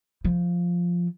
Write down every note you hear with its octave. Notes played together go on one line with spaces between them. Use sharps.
F3